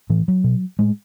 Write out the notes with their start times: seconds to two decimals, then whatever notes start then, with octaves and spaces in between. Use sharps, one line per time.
0.10 A2 E3
0.28 F#3
0.44 B2
0.79 A2 G#3